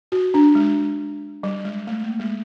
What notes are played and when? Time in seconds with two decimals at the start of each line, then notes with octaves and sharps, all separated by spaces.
0.12 F#4
0.34 D4
0.55 G#3
1.43 G3
1.65 G#3
1.87 A3
2.04 A#3
2.19 G#3